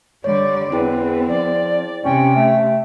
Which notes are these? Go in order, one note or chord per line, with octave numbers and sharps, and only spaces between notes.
D3 G3 C#5 D5
E2 C4 E4 G#4 B4 G5
F3 D5
C3 C#4 G5
A3